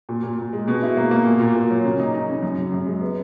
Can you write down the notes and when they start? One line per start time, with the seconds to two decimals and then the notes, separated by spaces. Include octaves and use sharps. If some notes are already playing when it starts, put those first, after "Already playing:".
0.09 A#2
0.23 A#2
0.38 A#2
0.53 G#3
0.68 B2
0.82 E4
0.97 A#3
1.11 A#3
1.26 A#2
1.40 A#2
1.55 A#2
1.70 F#3
1.84 C#3
2.00 D#4
2.14 D#4
2.29 C#3
2.42 F#2
2.58 C#3
2.72 F#2
2.87 G#3
3.01 B3